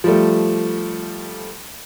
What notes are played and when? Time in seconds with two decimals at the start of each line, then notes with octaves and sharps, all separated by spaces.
0.04 F3 G3 A3